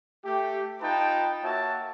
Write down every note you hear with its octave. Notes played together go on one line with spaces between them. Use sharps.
A3 G4
D#4 F4 B4 G5 A5
A#3 F#4 C#5 E5 A5